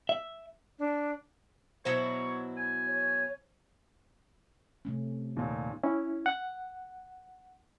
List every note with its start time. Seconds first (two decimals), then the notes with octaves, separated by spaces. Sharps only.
0.09 E5
0.78 D4
1.85 B2 F#3 E4 C5 C#5
2.57 G#5
2.88 C#5
4.85 C3 A3 C#4
5.36 D#2 A#2
5.83 C#4 E4
6.26 F#5